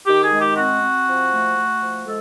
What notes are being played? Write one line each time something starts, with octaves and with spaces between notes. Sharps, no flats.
D#3 G4
G#4
G#3
G4
C4 F#4
C4
F3
A3
A3
F3
G#3 A4